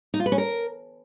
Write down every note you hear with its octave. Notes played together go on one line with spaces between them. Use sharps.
D#4
F4
B4
C#4
A#4